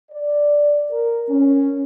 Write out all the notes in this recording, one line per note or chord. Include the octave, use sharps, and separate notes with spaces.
D5
A#4
C#4